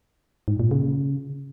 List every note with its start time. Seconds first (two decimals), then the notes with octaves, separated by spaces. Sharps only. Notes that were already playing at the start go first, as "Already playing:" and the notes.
0.48 G#2
0.60 A#2
0.71 C#3